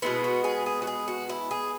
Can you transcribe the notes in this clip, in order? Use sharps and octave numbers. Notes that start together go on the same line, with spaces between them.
B2 G#3 B3 E4
F#4
G#4
G#4
F#4
G#4
F#4
E4
G#4